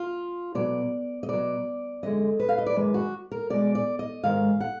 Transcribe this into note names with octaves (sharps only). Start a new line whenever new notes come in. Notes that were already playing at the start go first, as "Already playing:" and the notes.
Already playing: F4
B2 F#3 D5
D#5
B2 F#3 D5
F#2 D3 G#3 D#5
B4
F5
D#5
D5
F#2 D#3 G#3 B4
F#4
A#4
B2 G#3 D5
D5
D#5
G#2 D#3 G#3 F5
F#5